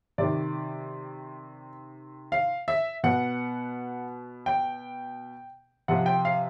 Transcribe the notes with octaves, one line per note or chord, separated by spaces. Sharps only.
C3 D#3 D5
F5
E5
B2 F#5
G5
C3 F3 F#5
G5
F5